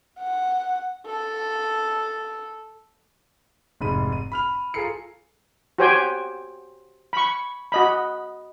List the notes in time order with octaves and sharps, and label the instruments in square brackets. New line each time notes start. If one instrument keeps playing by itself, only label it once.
[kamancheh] F#5
A4
[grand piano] F1 G#2 B5 D#7
D#7
B5 F6 F7
F4 G#4 A4 A#5 C7 C#7
[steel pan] F#4 G4 C5 C#5 G5 G#5
B5 C#6
F#4 D#5 B5